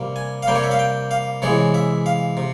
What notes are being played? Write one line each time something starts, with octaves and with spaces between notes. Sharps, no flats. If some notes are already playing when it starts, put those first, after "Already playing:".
Already playing: C3 G3 A#3
G#5
F5
C3 G3 A#3 G5
C#5
E5
F5
G5
F5
C3 E3 G#3 C#5
E5
F5
C3